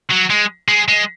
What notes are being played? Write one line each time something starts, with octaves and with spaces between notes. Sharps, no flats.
F#3
G#3
G#3
G#3